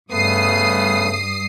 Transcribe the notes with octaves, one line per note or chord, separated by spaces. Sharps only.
G2 C#3 A3 B3 D#6 C7